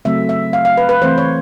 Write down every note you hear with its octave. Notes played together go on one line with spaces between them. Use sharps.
C#3 F#3 A3 C4 E5
E5
F5
F5
B4
B4
E3 A3 C4 C5
C#5